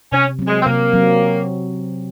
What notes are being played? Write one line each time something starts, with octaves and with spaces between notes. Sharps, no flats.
C3 C#4
F#3 C4
G#3
C4
C3 A#3
F#3 C4